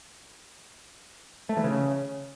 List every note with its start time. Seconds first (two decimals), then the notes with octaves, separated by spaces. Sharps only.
1.49 A3
1.57 E3
1.64 C#3